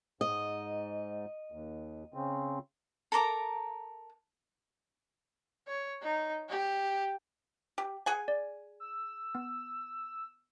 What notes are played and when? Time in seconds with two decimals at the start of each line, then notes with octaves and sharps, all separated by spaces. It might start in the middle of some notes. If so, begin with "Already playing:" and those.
0.21 G#2 D#5
1.52 D#2
2.14 C#3 C4
3.12 A4 A#4 A#5 D6
5.68 C#5
6.02 D#4
6.49 G4
7.78 G4
8.06 G#4 F#5 G#5
8.28 D5
8.80 E6
9.35 B3